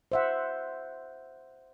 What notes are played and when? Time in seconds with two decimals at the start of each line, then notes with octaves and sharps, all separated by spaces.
0.12 C5 E5 F#5